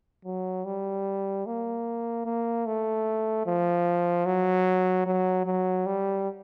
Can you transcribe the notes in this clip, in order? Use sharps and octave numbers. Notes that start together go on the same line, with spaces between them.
F#3
G3
A#3
A#3
A3
F3
F#3
F#3
F#3
G3